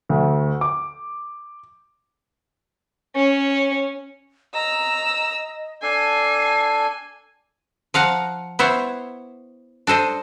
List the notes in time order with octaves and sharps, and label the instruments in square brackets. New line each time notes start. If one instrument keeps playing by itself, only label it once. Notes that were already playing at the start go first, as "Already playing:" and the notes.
[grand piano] D2
D6
[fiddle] C#4
[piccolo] D#5 [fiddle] A#5 E6
[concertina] D4 A4 [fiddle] G#5 [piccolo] C7
[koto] F3 F5 F#5 A#5
B3 E4 C5 C#5
D4 A4 C5 D#5